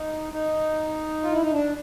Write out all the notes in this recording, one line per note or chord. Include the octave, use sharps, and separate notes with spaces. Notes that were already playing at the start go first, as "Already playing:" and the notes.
Already playing: D#4
D#4
F4
E4
D#4
D4